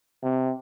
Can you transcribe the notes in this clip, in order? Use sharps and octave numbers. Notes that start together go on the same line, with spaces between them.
C3